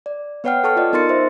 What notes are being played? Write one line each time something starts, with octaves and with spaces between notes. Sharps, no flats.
D5
B3 B4 C#5 F#5 G5 F6
A4 A5 C#6 F6
F4 D5 D#5
B3 D#4 A#4 C6 A6 C#7
C5 E5